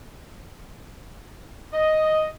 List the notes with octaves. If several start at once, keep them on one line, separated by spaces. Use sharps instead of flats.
D#5